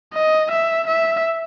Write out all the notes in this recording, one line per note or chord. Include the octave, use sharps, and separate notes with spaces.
D#5
E5
E5